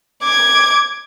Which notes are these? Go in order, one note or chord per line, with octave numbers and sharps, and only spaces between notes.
D6 G#6